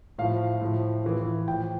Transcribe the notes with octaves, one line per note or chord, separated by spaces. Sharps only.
A2 F3 F5
A2 F3
A2 E3
A2 F3 G5